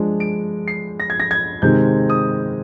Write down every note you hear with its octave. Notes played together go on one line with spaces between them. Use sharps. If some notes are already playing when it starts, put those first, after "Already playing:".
Already playing: F3 G#3 D4
D7
C7
A#6
G#6
A#6
G#6
C3 D#3 G#3 C4 D#4 G6
D#6